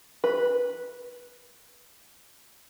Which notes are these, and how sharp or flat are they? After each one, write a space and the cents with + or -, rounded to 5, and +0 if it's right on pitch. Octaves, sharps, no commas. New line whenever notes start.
B4 -10